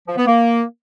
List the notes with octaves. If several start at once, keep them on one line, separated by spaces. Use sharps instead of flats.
F3
B3
A#3